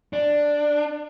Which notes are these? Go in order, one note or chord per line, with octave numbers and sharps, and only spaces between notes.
D4